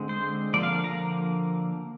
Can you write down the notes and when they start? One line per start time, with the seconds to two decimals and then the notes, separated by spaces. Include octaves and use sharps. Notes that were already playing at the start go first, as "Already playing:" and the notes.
Already playing: D3 G#3 C4
0.09 C5
0.54 D3 F3 A#3 D5
0.63 F5
0.84 A#5